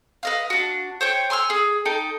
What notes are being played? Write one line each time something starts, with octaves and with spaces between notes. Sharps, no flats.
B4 D#5 F5
D4 F#4
C5 C#5 G5
G#5 C6 E6 F6
G#4
D#4 A4 G5